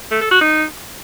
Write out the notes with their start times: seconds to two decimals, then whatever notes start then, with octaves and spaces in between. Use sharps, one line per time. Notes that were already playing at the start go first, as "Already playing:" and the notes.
0.11 A3
0.21 A4
0.31 F#4
0.41 D#4